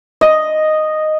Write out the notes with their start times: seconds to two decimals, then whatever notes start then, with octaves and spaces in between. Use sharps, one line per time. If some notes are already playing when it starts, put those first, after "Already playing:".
0.21 D#5